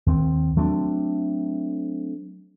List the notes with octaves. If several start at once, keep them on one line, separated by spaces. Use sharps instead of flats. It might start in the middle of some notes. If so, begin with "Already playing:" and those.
D#2 C4
F#3 A3 C4 D4